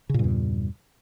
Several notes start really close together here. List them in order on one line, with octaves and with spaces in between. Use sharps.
C#3 A#2 G2 E2